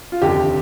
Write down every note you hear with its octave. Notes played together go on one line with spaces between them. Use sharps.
F4
F1 D#2 D3 G4